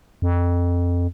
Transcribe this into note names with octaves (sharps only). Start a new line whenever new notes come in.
F2